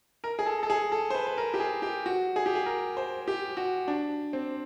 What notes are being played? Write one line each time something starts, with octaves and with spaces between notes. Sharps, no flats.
A#4
G#4
A4
A4
G#4
A4
C5
B4
B4
A#4
G4
G#4
G4
F#4
G#4
G4
G#4
A#4
C5
G4
F#4
D4
C4